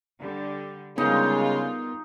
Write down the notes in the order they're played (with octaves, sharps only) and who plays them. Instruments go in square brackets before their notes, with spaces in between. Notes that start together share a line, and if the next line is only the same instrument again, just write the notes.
[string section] D3 G3
[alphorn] C#3 [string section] G3 G#3 F4 [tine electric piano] B3 A#4 [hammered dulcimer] D#4